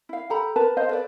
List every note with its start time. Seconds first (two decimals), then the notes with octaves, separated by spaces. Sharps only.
0.09 E4 F5
0.30 G4 A4 A#5 B5
0.56 A#4 B4 A5 A#5
0.77 C5 D#5 F5
0.89 A4 B4 D5